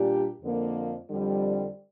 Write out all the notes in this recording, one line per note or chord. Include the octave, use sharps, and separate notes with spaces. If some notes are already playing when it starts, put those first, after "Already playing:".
Already playing: A#2 G3 D4 G4
F2 D3 F3 A#3
F2 D3 G3